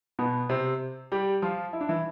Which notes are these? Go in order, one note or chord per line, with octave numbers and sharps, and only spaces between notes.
B2 B3
C3 C4
G3 G4
F3 F4
E4
D4
E3 E4